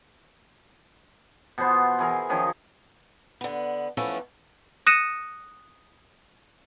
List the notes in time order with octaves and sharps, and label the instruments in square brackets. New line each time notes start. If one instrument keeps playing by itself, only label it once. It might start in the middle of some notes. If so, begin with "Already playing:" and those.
[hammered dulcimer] B2 B3 C5 C6
E3 G#4 A#4
D#3 F3 C#4
[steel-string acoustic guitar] D3 B3
E3 F3 A3 B3 C#4 A4
[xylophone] D#6 F#6 A#6 C#7 D#7 E7